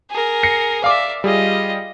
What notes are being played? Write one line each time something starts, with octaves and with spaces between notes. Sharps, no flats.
G#4 A#4
A#6 C7 C#7
D5 E5 F5 D6
G3 F4 G#4 D#5